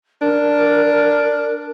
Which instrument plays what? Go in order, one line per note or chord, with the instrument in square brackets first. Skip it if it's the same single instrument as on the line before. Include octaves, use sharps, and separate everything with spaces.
[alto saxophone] D4 [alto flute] A#4